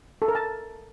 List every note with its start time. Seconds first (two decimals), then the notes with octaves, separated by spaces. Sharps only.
0.22 A4
0.28 A#4
0.35 A5